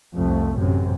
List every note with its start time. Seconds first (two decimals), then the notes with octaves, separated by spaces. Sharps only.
0.15 C2 F2 A3
0.58 A1 F#2 C3